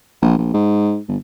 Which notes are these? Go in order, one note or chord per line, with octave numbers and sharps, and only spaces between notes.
A#1
A#1
G#2
G1